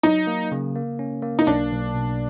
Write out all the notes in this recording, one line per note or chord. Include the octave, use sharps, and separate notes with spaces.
F#3 D#4
A#3
C#3
A#3
C#4
A#3
D#4
B1 D4
B1
B2